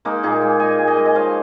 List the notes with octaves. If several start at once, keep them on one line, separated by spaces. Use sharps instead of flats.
G#3 A#3 D#4
A#2 D#4 G#4
G#3
A#2 D#5 G#5
A#2
D#5 G#5
G#3
D#5
F3 C#5 F5